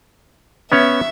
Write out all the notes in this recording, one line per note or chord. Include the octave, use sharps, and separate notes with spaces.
B3 C#4 C#5 E5